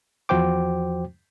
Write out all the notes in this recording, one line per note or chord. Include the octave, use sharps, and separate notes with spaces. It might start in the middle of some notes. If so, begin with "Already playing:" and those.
E2 F3 F#4 C5 G5 D6